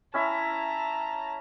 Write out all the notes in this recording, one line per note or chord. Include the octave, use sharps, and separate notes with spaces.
C#4 E4 E5 A5 A#5